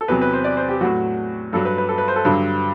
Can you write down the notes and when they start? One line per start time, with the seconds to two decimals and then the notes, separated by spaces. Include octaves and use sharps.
0.01 A4
0.08 E2 C3 F#3 B4
0.21 B4
0.33 C5
0.44 D5
0.57 C5
0.69 G4
0.81 A2 F#3 F#4
1.53 G2 F#3 A4
1.65 B4
1.78 B4
1.89 A4
1.98 B4
2.08 C5
2.16 A4
2.25 G2 D3 F#3